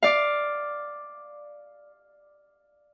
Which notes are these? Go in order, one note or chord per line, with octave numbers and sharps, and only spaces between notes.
D5 F5